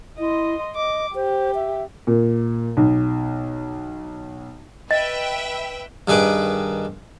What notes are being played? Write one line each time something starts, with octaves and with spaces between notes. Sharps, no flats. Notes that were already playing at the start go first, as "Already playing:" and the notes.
E4 D#5 C6
D#5 D6
G4 C5
E5
A#2
B1
B4 D#5 E5 G5
G2 D#3 G#4 B4 D6